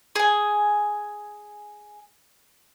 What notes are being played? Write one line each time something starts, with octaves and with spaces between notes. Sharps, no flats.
G#4 G#5